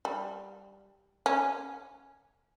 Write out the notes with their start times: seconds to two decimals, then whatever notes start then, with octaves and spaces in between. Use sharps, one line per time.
0.05 G3
1.26 C#4